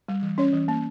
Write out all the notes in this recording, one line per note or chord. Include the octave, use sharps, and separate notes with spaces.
G3
E3
C#4 C#5
E3
A#3